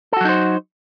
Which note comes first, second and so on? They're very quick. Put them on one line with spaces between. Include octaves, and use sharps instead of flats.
A4 F#4 F#3 D#4 C5